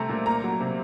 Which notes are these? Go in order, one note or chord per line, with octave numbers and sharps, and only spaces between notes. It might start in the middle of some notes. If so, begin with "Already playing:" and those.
Already playing: C3 A3 C4 A#5
A#2
A#3 A#5
F#3
C3